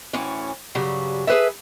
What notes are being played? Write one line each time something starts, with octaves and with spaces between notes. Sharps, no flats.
D2 A2 E3 C#4
G2 C#3 F#3 G3 F#4
G#4 A4 B4 C#5 E5